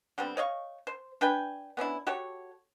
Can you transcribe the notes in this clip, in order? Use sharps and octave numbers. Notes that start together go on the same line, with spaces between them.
D3 G3 B3 C4
C#5 D#5 F5 C#6
C5
D4 B4 G5 G#5
B3 C#4 D4 E4
F#4 G4 A4 C#5